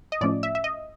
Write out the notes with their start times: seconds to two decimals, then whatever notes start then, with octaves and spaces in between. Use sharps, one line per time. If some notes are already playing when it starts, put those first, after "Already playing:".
0.12 D#5
0.21 A2 F3 A3 C#4 D5
0.43 E5
0.55 E5
0.64 D#5